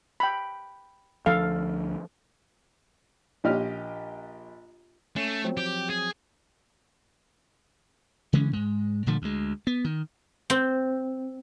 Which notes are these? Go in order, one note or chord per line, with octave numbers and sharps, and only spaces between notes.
G5 B5
D2 F3 D4 A4 F5
A#1 A#2 G4 D#5 F6
A3 C#4 C7
F3 F#3 C4
G4
G#4
C#3 E3 G#3 C#4
G#2 G#3
A#2 D3 F3 A3
D2 G#3
B3
D#3
C4